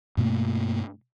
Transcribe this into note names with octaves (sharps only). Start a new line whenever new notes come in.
G2 B2 A3 A#3